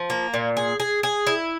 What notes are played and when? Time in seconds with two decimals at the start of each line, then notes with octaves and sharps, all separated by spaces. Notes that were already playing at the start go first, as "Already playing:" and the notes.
Already playing: F3
0.10 A#3
0.34 A#2
0.57 G#4
0.80 G#4
1.03 G#4
1.27 E4